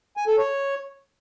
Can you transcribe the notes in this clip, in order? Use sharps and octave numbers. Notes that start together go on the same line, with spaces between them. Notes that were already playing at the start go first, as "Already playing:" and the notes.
G#5
A4
C#5